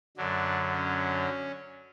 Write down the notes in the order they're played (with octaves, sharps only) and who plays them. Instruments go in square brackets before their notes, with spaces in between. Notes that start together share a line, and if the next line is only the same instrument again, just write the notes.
[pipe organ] F#2 D3 F#3 D4
C#4